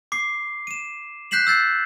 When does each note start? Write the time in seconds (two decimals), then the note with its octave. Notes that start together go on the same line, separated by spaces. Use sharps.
0.12 D6 C7
0.67 D#7 E7
1.31 F#6 G6 B6 C7 E7 F#7
1.47 E6 G6 A6 C7